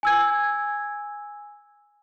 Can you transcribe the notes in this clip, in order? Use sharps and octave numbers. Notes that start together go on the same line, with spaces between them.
G#5 E6 G#6